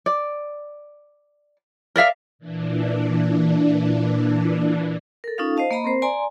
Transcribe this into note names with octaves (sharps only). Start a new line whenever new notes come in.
D5
A#4 D5 E5 F5
A#2 E3 D4
A4 A#4
C#4 D#4 F4 A4 F5
C5 D#5 F5 A5
A#3 D#5 A#5 B5
C4 A#4 C5
D5 G#5 A#5 C6